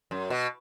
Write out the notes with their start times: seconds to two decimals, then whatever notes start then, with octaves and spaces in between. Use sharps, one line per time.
0.11 F#2
0.30 B2